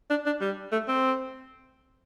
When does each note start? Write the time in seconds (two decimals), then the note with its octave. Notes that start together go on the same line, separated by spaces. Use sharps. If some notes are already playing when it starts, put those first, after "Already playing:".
0.10 D4
0.26 D4
0.41 G3
0.72 A3
0.88 C4